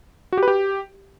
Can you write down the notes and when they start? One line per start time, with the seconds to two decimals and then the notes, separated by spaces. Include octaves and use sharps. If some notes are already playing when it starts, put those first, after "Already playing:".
0.32 F#4
0.38 G4
0.43 B4
0.48 G4